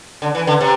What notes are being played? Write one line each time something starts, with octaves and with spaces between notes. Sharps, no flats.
D3
E3
D3
C3